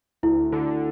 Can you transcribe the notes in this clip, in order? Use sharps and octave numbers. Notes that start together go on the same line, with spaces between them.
D2 E4
D3